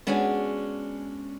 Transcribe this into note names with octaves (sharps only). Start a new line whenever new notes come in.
G#3 B3 C#4 D4 F#4 G#4